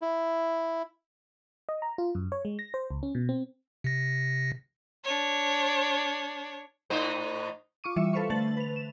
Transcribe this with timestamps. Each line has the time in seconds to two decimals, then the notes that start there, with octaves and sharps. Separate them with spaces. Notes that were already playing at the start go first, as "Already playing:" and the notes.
0.02 E4
1.69 D#5
1.82 A#5
1.98 F4
2.15 F#2
2.32 C#5
2.45 G#3
2.59 A#6
2.74 C5
2.90 C#2
3.03 C#4
3.15 B2
3.29 C4
3.84 C3 A#6
5.04 D4 C#5
6.90 A2 D#4 C5
7.84 F4 C#6 D6 D#7
7.96 E3 G3 E5 C#7 E7
8.13 A4 B4 C5 F5 C#6
8.30 D3 A3 C5 A6 F#7
8.57 B4 F7
8.76 E7